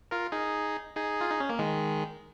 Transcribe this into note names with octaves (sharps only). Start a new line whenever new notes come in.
F4 A#4
D#4 G#4
D#4 G#4
F4
D#4
C#4
A#3
D#3 G#3